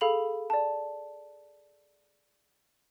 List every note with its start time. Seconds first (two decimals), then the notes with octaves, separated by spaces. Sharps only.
0.01 G#4 A4 F5 B5 F7 F#7
0.50 D5 A5